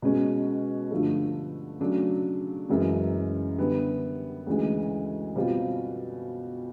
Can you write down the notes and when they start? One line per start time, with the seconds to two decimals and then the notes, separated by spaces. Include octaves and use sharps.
0.02 B2 G#3 C#4
0.91 G2 D3 F3 A3
1.80 C#3 F#3 A3 D4
2.69 F#2 C#3 E3 G#3
3.58 D3 G3 B3
4.47 D2 C#3 E3 G#3
5.36 B2 G3 C4 F4